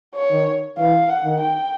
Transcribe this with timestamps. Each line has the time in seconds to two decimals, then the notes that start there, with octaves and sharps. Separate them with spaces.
0.15 C#5
0.31 D#3
0.78 E3 F5
1.09 F#5
1.24 D#3
1.40 G5